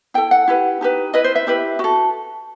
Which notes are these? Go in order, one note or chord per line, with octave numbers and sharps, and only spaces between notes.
E4 A4 G5
F#5
E4 G4 B4
D#4 G4 B4
E4 B4 D#5
C5
E5
E4 G4 B4
F#4 A4